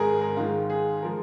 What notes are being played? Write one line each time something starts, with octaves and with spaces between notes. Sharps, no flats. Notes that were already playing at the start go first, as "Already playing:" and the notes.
Already playing: G#1 G#2 G#3 G#4 A#4
A#4
G#1 G#2 D#3 G#3 F4
G#4
F3 G#3 A#4